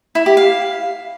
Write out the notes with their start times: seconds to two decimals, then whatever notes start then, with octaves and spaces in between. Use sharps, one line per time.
0.15 E4
0.26 G4
0.37 F5